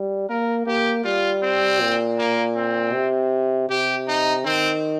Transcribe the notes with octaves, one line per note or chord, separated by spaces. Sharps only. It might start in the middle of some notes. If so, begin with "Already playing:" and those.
Already playing: G3
A#3 A#4
A#3 G4
G3 F4
C4
A#2
A#3
C4
C3
C3 G4
D#4
D#3 C4